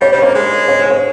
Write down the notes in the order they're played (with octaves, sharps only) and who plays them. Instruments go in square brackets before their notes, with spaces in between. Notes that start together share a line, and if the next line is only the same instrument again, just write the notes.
[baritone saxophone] G3 [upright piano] C#5
[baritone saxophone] G3 [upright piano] C5
[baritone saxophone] A#3 [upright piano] C#5
[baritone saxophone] G#3
[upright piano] C#5
C5
C#5